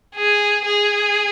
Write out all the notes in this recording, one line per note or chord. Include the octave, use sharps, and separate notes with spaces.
G#4
G#4